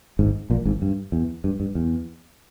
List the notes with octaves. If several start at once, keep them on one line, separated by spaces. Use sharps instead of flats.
G#1 G#2
A#1 A#2
G#1 G#2
G2
E2
G2
G2
E2